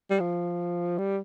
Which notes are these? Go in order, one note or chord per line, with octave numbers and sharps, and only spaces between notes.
G3
F3
G3